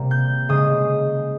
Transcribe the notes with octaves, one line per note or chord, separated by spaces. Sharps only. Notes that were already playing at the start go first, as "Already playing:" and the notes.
Already playing: C3 G3 A#3
G6
C#3 G#3 D#6